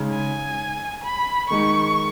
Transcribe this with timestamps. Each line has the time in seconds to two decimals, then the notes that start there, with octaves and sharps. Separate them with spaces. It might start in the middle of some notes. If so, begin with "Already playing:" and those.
Already playing: C#3 G#3 D#4
0.11 G#5
1.04 B5
1.50 D#3 G#3 D#4 C#6